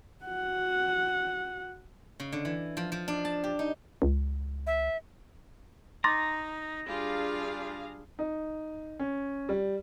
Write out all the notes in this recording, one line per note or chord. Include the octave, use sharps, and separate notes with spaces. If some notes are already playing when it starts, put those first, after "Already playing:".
F#4 F#5
C#3
D3
E3
F3
F3
D4
A5
G4
D#4
C#2
E5
D#4 A#5 C6 D6 A6
G3 D4 F4 G#4 F5
D#4
C#4
G3